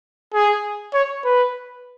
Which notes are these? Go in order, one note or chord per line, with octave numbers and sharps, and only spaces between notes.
G#4
C#5
B4